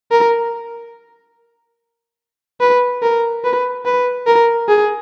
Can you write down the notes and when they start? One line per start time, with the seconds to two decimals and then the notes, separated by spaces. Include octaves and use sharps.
0.11 A#4
2.60 B4
3.03 A#4
3.44 B4
3.85 B4
4.27 A#4
4.69 G#4